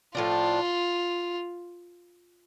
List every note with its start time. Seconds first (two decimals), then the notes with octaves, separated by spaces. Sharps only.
0.15 A2 F3 D4 F4